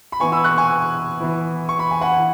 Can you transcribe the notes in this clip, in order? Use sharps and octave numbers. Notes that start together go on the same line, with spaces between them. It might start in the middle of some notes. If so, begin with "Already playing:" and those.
B5
E3 B3 E4 G#5 C#6
B5 E6
C#6 F#6
G#5 C#6
E3 B3 E4
C#6
B5
G#5
F#5 B5
E3